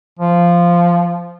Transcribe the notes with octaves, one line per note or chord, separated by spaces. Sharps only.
F3